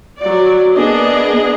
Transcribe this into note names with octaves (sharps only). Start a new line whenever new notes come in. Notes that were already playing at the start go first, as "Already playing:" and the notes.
F#3 D5
A#3 B3 D4 G#4 D#5